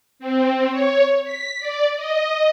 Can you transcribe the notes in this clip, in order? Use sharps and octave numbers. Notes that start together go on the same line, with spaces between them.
C4
C#5
B6
D5
D#5